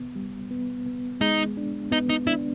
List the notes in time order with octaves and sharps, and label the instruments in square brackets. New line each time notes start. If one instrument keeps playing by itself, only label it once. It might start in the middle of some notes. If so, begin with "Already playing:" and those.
Already playing: [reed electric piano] B3
G3
B3
B3
[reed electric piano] G#3 [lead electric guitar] D#4
[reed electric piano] D4
[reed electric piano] B3 [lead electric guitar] D#4
[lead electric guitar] D#4
[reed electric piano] D4 [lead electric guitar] E4